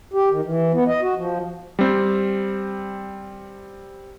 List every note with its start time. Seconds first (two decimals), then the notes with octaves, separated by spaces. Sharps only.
0.14 G4
0.30 D#3
0.44 E3
0.73 B3
0.87 D#5
1.02 F#4
1.16 F3
1.79 G3 C4